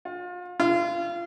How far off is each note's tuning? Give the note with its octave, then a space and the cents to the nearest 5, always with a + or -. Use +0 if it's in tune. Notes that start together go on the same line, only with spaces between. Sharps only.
F4 +35
F4 -30